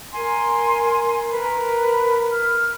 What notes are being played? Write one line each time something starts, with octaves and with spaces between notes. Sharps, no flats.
A#4 G#5 C6
A#4 B4 B5
F6